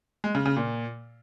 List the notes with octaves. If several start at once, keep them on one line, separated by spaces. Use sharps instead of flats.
G#3
C#3
C#3
A#2